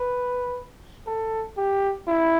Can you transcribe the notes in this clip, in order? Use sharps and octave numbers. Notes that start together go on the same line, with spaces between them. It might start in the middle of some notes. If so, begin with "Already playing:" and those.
Already playing: B4
A4
G4
E4